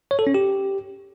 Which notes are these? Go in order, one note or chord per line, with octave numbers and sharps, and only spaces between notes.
C#5
A4
C#4
G4